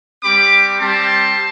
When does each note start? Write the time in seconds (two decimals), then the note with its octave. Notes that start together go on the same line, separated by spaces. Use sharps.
0.23 G3 C4 G4 B5 D6
0.79 G3 C4 G4 A5 C6